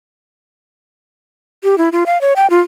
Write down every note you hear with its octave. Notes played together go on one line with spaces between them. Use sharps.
G4
E4
F4
F5
C#5
G5
F4